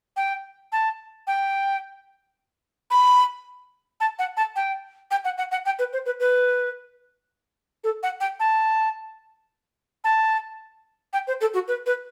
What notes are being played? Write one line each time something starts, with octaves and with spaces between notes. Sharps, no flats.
G5
A5
G5
B5
A5
F#5
A5
G5
G5
F#5
F#5
F#5
G5
B4
C5
B4
B4
A4
F#5
G5
A5
A5
G5
C5
A4
F#4
B4
B4